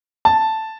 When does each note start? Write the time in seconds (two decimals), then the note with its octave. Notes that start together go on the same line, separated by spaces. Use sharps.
0.25 A5